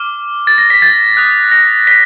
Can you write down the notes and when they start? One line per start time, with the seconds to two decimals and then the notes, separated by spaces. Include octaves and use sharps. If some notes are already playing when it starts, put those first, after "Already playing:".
Already playing: D6 F6
0.47 A6
0.58 A#6
0.70 B6
0.82 A6
1.17 D#6 F#6
1.52 A#6
1.87 B6